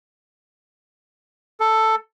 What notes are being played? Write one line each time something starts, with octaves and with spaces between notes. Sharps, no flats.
A4